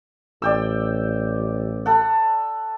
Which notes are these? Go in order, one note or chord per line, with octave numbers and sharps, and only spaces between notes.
A1 D5 G5 E6
A4 F#5